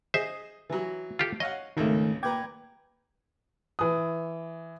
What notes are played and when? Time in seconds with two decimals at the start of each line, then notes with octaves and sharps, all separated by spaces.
0.14 G#4 C5 D#5 E5
0.70 E3 F#3
1.19 F4 G4 A4
1.40 C#5 D#5 F5 F#5
1.77 G#1 C#2 D#3 A3
2.23 A#2 B4 G5 A#5 D6 G#6
3.79 E3 D#6